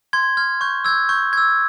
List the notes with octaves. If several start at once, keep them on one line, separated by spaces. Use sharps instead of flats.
C6 G#6
F6 G#6
C#6 G6
E6 G6 G#6
C#6 G6
E6 G6 G#6